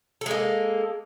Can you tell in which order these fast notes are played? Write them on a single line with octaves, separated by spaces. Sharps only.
A4 G#3 A#3